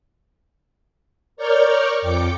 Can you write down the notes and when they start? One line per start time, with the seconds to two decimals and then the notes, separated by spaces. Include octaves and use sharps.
1.37 A#4 C#5 D5 C#6 F6 G6
1.99 F2 G5 D6 C#7